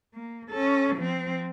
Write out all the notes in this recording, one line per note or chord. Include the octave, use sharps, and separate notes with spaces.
A#3
C#4 A4
F3 C4